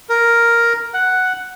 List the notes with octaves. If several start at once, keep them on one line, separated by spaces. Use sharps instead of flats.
A#4
F#5